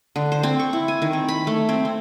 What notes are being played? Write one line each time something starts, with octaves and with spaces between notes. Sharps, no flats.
D3
C5
C4
C#6
E4
G#5
D#3
C4
B5
A3
C4
C4